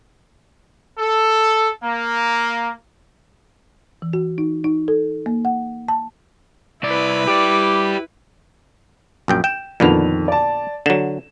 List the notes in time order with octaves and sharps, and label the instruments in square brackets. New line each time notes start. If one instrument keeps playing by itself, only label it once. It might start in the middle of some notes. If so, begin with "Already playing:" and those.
[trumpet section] A4
A#3
[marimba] E3
F#4
D#4
D#4
A4
A#3
F#5
A5
[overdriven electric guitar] C2 D5 [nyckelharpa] E4 B4
[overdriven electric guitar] G4 D5 [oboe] D6
[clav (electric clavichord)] A#1 F#2 G5
[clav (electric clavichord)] G5 [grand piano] E7
[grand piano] F2 D#3 F7 [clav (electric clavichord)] A#2 D3 B3
[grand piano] D5 A5
[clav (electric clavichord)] D3 F#3 [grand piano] E7